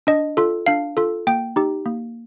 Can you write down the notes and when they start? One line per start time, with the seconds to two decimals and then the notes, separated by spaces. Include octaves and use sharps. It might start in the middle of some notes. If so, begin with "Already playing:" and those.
0.07 D4 D#5
0.37 F4 A4
0.67 D4 F5
0.97 F4 A4
1.27 A#3 G5
1.56 D#4 G4
1.86 A#3